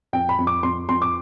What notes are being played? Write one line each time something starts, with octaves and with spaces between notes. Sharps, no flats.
F2 G5
B5
F2
D6
F2 C6
F2 C6
D6